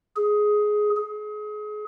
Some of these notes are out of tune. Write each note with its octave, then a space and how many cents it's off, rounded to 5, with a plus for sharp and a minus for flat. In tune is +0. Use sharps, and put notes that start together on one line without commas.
G#4 +10
G#4 +30